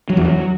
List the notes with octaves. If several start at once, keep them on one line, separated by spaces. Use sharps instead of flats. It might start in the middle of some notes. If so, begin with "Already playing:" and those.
F#3
E2
F#3